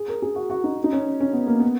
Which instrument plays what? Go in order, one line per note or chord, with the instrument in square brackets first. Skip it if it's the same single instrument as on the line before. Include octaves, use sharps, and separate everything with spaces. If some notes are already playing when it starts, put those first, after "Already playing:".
Already playing: [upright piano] G#4
A#4
G#4
F#4
F#4
D#4
D#4
C#4
C#4
B3
A#3
B3